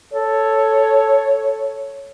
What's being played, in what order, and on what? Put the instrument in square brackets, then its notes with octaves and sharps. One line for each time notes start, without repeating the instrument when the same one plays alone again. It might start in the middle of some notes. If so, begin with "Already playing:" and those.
[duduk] A4 [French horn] C#5